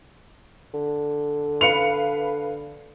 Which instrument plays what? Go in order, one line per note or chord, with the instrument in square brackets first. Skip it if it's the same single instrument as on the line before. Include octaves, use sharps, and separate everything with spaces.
[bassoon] D3
[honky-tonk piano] B4 F5 B5 [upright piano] C#7 F7